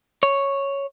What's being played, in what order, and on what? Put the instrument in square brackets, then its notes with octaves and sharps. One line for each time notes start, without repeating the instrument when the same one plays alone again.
[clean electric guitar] C#5